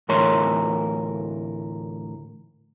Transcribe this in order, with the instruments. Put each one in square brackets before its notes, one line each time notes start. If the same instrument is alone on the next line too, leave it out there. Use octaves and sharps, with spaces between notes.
[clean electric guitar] D2 A2 E3 A#4 C#5 C6